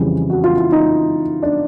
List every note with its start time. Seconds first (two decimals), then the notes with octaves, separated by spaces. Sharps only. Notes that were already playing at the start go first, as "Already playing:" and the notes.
Already playing: F2 C#3 E3 G3 G#4
0.30 F#4
0.44 F4
0.58 E4
0.72 D#4
1.43 D4